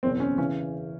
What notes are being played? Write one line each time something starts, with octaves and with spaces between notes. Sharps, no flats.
F#1 E2 B2 C4
C#4
C#3 E3 C#4